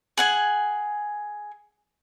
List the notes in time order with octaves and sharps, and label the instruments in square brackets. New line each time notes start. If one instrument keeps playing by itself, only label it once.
[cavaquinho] G#4 F#5 G#5